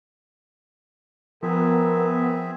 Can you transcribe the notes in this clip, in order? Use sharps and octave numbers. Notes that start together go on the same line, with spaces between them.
F3 B3 C4 G#4 A#4 E5